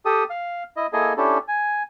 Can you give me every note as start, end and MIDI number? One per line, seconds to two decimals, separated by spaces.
0.06 0.24 67
0.06 0.24 69
0.06 0.24 87
0.30 0.63 77
0.77 0.87 64
0.77 0.87 75
0.93 1.13 58
0.93 1.13 64
0.93 1.13 68
0.93 1.13 69
0.93 1.13 75
0.93 1.13 80
1.17 1.38 61
1.17 1.38 62
1.17 1.38 64
1.17 1.38 67
1.17 1.38 69
1.48 1.83 80